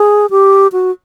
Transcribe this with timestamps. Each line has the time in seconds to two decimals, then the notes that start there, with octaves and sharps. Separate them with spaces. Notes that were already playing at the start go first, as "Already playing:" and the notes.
Already playing: G#4
0.31 G4
0.72 F#4